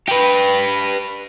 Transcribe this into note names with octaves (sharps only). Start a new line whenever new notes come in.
G4 B4